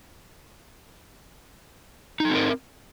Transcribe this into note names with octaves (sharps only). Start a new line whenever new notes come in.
C4 D#4 A4 A#4